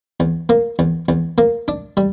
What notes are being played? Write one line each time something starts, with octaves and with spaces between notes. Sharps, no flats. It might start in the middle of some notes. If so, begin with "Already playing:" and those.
E2
A#3
E2
E2
A#3
D4
G3